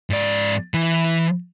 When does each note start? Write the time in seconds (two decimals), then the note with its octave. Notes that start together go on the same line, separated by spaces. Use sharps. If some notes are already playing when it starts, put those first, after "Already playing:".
0.10 G#2 D5
0.74 E3